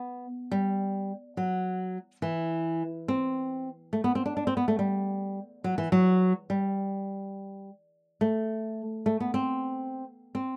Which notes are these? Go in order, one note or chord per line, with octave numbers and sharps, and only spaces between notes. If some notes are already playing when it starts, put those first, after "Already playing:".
Already playing: B3
G3
F#3
E3
C4
A3
B3
C4
D4
D4
C4
B3
A3
G3
F#3
E3
F#3
G3
A3
A3
B3
C4
C4